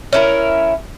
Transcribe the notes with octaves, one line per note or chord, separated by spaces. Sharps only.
C#4 E4 A#4